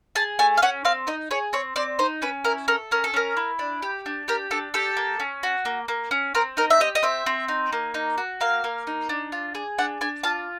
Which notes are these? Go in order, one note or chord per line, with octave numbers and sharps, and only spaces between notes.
G#4 A5
A3 G#5
F5
C#4 F#5
C4 F5
D#4 D#5
G#4 C#5
C4 C#5
C4 D5
D#4 C5
C#4 B4
E4 A#4
A4 A#4
C#4 A#4
A4
C#4 A#4
E4
D4
G4
D4
G4 A#4
D4 A4
G4 A4
A#3
C#4
F#4
A#3
A#3
C#4
C4 A#4
D#4 A#4
E5
G4 D#5
D#5
C4 E5
C4
D#4
A#3
D#4
F#4
A#3 F5
A#3
D#4
D4
F4
G#4
D4 F#5
D4 G#5
F4 A5